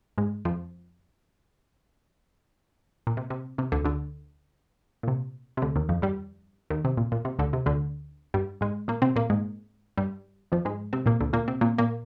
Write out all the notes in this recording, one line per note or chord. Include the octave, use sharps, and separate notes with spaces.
G#2 G#3
F2 F3
A#2
C3
C3
C3
D2 D3
D2 D3
A#2
C3
C3
D2 D3
D#2 D#3
F2 F3
G2 G3
D#2 D#3
C3
A#2
A#2
C3
D2 D3
C3
D2 D3
G2 G3
G#2 G#3
A#2 A#3
C3 C4
A#2 A#3
G#2 G#3
G2 G3
F2 F3
G#2 G#3
C3 C4
A#2 A#3
D2 D3
A#2 A#3
C3 C4
A#2 A#3
A#2 A#3